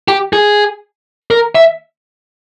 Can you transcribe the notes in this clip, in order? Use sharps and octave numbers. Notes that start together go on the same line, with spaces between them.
G4
G#4
A#4
E5